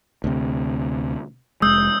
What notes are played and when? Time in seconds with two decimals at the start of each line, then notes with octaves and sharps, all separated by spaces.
0.24 D2 C3
1.62 F1 G#3 D#6 E6 G6